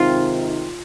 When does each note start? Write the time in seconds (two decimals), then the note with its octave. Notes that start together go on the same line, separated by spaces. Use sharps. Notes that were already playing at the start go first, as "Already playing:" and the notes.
Already playing: C3 D#3 G#3 C4 D#4 F4